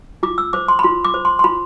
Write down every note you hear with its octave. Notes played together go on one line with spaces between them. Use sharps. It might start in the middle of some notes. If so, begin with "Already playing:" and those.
F4 D6
E6
C5 D6
C6
B5
F4 C6
D6
C5
C6
C6
F4 B5